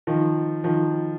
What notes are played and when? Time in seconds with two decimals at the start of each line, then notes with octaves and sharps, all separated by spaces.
0.07 D#3 F3
0.64 D#3 F3